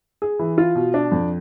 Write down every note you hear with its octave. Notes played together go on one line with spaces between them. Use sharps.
G#4
E3
F4
B2
D4
F2